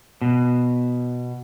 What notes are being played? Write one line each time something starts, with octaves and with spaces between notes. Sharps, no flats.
B2